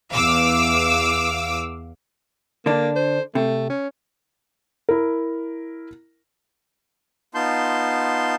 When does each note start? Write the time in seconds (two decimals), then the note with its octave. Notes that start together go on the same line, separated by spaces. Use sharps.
0.11 E2 F5 D6 E6
2.66 D3 A#3 D4
2.96 C5
3.35 C3 A3
3.70 C#4
4.89 E4 A#4
7.35 B3 D#4 F4 A5 C6 G6